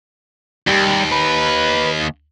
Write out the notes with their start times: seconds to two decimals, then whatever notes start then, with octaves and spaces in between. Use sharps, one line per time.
0.67 D#2 G3 G4
1.12 B4